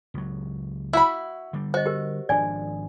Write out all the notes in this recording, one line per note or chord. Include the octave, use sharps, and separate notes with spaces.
C#2 F#3
E4 F#4 B5 E6
D3 G3
F#4 C5 D#5
G4 A#4
G#1 F3 D4 D5 G#5